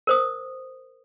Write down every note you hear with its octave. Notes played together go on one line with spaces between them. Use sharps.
A#4 C5 D#6